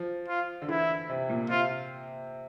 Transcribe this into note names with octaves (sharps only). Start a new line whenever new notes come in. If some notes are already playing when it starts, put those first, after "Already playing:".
Already playing: F3
F4
D3
E3 E4
C3
A#2
C3 F4